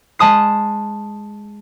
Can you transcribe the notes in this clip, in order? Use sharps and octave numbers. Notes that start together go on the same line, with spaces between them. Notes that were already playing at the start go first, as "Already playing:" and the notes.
G#3 A5 D#6 C7